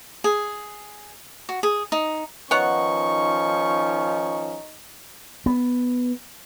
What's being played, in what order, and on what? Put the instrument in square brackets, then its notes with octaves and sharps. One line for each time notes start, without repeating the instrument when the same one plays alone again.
[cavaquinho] G#4
F#4
G#4
D#4
[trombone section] D#3 F3 C#4 [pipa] B3 C#5 F#5 [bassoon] D#4 [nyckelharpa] C#6
[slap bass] B3